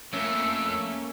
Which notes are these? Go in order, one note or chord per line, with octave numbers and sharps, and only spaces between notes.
F2 A3 A#3 C#4 E6